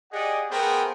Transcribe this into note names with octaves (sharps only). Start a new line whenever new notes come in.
G4 G#4 D5 D#5 F#5
A3 B3 G#4 A#4 C5 G5